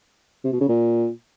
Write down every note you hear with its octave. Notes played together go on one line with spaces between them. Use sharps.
C3
B2
C#3
A#2